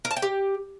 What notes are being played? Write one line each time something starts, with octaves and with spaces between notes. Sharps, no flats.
A#4
A5
G5
G4